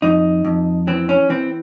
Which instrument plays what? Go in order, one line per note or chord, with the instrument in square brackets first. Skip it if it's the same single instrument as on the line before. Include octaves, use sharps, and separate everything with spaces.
[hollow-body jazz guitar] F2 D#4
F2
E3 C4
C#4
E3 C4